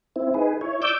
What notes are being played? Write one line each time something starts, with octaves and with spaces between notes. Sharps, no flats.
C4 E4
D#4 G#4 B4
E4 C#5
D5 D6 E6 G6